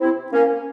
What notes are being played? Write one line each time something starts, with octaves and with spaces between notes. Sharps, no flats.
C4 E4
A#3 C#4